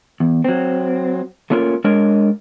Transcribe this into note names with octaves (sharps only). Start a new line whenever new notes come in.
E2
F#3 C4
A3 A#3 C#4 F4 A4 A#4
G#3 D4 A#4 C#5 D#5